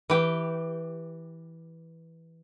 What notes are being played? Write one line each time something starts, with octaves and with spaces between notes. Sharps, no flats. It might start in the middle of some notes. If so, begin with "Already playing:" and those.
E3 G4